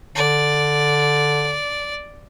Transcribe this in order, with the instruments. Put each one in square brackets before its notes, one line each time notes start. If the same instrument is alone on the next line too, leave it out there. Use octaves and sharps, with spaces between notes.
[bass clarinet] D3 [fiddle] D5